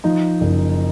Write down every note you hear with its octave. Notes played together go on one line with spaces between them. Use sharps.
F3 D#4
F#1